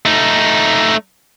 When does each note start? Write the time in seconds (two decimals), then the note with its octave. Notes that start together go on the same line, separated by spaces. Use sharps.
0.06 A3 D#4